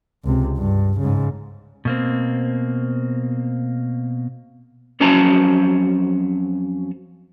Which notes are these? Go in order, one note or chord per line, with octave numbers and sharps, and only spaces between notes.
C#2 C3
G2
G#2 C#3
B2 A#3 C4
F2 F#3 C#4 C5 A5 A#5